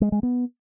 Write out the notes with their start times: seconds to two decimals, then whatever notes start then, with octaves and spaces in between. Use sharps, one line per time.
0.01 G#3
0.12 G#3
0.23 B3